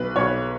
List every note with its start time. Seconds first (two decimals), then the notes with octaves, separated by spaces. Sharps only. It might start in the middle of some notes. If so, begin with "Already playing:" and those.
Already playing: B1 B4
0.16 B1 C#5